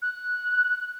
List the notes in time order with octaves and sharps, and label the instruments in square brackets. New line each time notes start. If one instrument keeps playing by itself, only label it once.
[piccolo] F#6